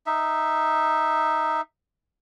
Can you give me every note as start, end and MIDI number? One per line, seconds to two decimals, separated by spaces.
0.06 1.61 63
0.06 1.61 76